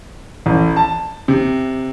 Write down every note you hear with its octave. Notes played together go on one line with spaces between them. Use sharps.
A1
A5
C3